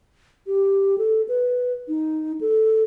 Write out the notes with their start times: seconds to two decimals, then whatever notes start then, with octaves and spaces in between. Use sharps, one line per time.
0.47 G4
0.98 A4
1.28 B4
1.88 D#4
2.41 A4